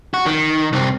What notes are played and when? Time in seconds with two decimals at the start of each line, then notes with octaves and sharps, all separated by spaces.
0.14 F#4
0.26 D#3
0.73 C2 C4